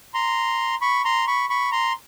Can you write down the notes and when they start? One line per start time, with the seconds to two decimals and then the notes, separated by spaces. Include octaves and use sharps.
0.14 A#5 C6
0.81 B5 C#6
1.05 A#5 C6
1.27 B5 C#6
1.49 B5 C#6
1.72 A#5 C6